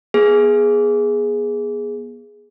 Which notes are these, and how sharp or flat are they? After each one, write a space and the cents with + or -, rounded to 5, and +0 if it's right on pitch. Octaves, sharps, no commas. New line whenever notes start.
B3 -30 G#4 +0